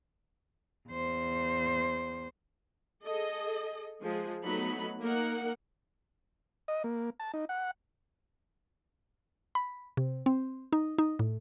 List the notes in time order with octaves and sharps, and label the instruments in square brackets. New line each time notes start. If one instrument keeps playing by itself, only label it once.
[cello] E2 C5
[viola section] G#4 A4 D#5
F3 G#3 G#4
F#3 A3 B3 D#4 B5
A#3 D#4 A#4 F#5
[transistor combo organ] D#5
A#3
A5
D#4
F#5
[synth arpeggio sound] B5
C3
C4
D#4
D#4
A2